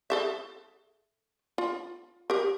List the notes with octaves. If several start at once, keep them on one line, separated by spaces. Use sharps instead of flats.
G#4 A4 E5
F4
G4 A#4